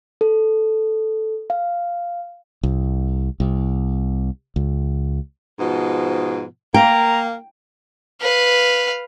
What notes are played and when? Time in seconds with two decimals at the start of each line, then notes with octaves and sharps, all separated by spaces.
0.21 A4
1.50 F5
2.63 C2
3.40 C2
4.56 C#2
5.60 G#2 B2 F3
6.74 A#3 G5 A#5
8.21 B4 F5